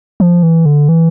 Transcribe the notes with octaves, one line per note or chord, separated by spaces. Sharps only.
F3
E3
D3
E3